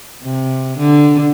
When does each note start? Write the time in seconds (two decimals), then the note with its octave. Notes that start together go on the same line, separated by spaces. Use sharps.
0.23 C3
0.78 D3